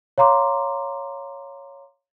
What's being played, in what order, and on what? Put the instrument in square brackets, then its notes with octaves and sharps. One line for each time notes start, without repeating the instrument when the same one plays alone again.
[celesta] C#5 F5 A#5 C6 D6